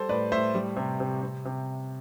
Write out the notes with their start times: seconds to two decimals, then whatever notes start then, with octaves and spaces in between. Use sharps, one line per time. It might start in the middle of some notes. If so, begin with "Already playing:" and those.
Already playing: G3 A4 C5
0.09 A2 B4 D5
0.32 A2 C5 E5
0.55 G3
0.76 C3
1.00 C3
1.22 C3
1.45 C3